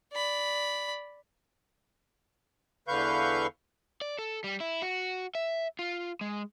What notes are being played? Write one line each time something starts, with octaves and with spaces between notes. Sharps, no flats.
D5 B5
E2 D3 B4 F5 C#6 G6
D5
A4
G3
E4
F#4
E5
F4
G#3